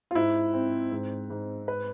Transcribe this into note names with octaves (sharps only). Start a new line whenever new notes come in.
F4
G#2 E4
C4
G#2
G#2
B4